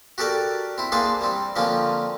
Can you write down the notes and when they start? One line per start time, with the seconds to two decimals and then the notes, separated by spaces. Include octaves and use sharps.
0.18 F#4 G4 A4 A#4 D5
0.78 C4 E4
0.92 A#3 D4 G#4 C5 F5
1.21 G3 C4
1.56 D3 F3 A#3 C4 C#4